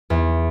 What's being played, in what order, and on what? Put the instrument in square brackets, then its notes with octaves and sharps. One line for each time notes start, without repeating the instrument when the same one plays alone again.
[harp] E2